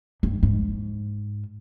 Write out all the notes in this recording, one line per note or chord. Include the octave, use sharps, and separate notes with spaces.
G2
G#2